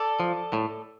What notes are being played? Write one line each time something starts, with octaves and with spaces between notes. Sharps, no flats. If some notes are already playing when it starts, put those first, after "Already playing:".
Already playing: A4 D5
F3
A2